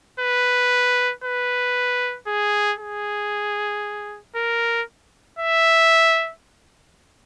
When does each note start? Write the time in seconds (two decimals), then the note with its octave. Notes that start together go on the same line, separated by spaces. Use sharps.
0.20 B4
1.24 B4
2.27 G#4
2.79 G#4
4.36 A#4
5.39 E5